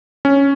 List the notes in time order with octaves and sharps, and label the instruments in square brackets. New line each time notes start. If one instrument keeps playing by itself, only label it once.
[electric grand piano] C#4